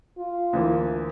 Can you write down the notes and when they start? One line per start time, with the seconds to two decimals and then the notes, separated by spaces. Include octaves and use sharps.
0.18 F4
0.53 D2 E3 A#3